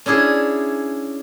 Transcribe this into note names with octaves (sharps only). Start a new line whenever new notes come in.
C#4 D4 E4 G#4